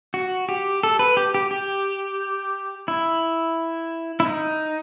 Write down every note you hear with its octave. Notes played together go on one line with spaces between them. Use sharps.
F#4
G4
A4
B4
G4
G4
G4
E4
E4
D#4